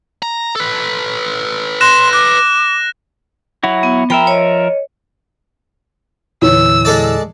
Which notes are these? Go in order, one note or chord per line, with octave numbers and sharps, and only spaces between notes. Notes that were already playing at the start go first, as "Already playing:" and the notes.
A#5
A4 B4
C6 F#6 A#6 E7
D6 F#6
F#3 E4 F#4
B3
F3 A#4 E5 G5 A#5 B5
C#5 D#5
E2 A#2 D3 E3 C#5 E6
G#3 A4 D5